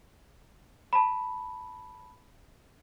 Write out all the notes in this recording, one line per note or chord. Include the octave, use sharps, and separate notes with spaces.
A5 B5